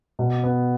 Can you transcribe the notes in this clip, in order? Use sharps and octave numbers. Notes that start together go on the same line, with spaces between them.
B2
B3